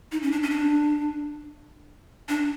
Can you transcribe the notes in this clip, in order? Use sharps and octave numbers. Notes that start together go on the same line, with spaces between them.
D#4
C#4
D4
C#4
D4
D4